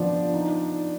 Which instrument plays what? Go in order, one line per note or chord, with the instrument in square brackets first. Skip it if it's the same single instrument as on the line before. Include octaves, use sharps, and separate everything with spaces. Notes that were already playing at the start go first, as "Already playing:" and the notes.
Already playing: [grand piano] F3 B3 [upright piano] D4
[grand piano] D#4